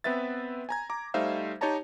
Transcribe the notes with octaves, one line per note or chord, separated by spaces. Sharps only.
B3 C4 B4 E5 A6
G#5 A#5 G#6
A#5 D6
G3 A3 D#4 C5 E5 F5
D#4 G4 C#5 D#5 A5 A#5